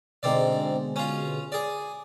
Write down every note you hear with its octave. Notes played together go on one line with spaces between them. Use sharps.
G#2 B2 D3 G#3 C4 D5
C#4 F4
G#4 D5